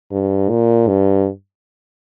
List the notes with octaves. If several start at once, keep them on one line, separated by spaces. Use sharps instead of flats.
G2
A#2
G2